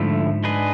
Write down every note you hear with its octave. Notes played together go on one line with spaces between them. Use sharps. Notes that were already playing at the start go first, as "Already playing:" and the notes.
Already playing: G#2 D3 F3 A3 E4
G#3 D4 G#4 B4